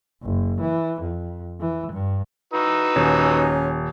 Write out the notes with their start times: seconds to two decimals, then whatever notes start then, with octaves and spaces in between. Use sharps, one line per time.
0.23 F#1
0.61 E3
1.02 F2
1.60 E3
1.93 G2
2.54 D#4 F#4 B4 E6
2.96 D#1 C#4